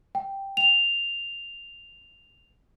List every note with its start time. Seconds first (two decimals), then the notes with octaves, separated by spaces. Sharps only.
0.15 G5
0.57 F7